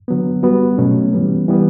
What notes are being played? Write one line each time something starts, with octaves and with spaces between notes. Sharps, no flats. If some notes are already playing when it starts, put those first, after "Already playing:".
D3 F#3 B3
G3 B3 F#4
B2 F#3 A3 C#4
E3 G3 B3
E3 G3 B3